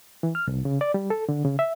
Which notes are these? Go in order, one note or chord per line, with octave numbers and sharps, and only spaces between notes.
E3
F6
C2
C#3
D5
G3
A4
D3
C#3
E5